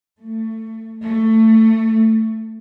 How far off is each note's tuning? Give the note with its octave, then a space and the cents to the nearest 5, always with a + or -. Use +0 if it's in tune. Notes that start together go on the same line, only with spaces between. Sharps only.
A3 +25
A3 +20